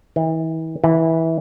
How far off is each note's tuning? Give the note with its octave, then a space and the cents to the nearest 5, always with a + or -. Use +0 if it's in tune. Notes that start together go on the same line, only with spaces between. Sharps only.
E3 -40
E3 -20